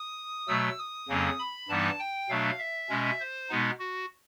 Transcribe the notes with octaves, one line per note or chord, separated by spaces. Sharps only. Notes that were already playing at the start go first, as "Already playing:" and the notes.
Already playing: D#6
B2 F#3 A3 E6
D#6
F2 C#3 F#3 A#3 C#4
B5
G2 E3 G3 B3 D#4 A5
G5
B2 F#3 A3 D4 F5
E5
B2 G#3 C#4
C5
B2 G#3 B3 D#4
F#4